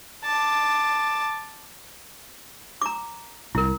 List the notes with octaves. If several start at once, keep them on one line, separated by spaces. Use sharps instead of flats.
A5 D6
A#5 D6
C2 E4 A#4